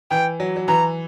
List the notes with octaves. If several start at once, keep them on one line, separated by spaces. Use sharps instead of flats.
E3 G5
F#3
F#3
E3 A#5